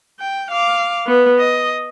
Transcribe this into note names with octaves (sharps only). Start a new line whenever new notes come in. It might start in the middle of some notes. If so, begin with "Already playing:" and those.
G5
F5 D6
B3
D#5